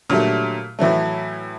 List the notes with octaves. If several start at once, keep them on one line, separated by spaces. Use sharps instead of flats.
A#2 D3 F#3 G3 A3
A2 E3 F#3 A3